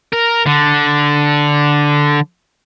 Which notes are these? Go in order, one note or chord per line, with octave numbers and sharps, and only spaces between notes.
A#4
D3